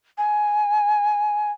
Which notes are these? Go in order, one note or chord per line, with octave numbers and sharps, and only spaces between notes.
G#5